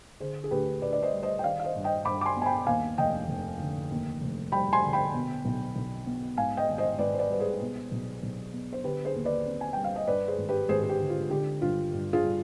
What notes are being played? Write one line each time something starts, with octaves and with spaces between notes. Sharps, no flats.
D3 G#4 C5
G#4
D2 G4 B4
D2 B4 D5
D5
C5 D#5
G3
C5 D#5
G5
D#3 D5 F5
F5
C5 D#5
G2
D#5 G5
G2 B5 D6
D6
G#5 C6
B3
G#5
G5 B5
D#2 F5 G#5
F1 D#5 G5
F1
D3
D#2
F1
G3 G5 B5
G#5 C6
D3
G5 B5
B2
B1
B1
B3
G#2 F5 G#5
D#5 G5
G#1
C5 D#5
G#1 B4 D5
C5
B4 D5
G3 B4
G#4 C5
B2
B1
B1
B3
C5
D3 G4 B4
G#4 C5
D#2
B4 D5
C4
G#5
G3 G5
F5
D#5
G2 B4 D5
G#4 C5
G#1
G4 B4
G#1 G#4 C5
G#4
G4
D3
F4
D3 G4
G2 F4
G2
F4 G#4
G3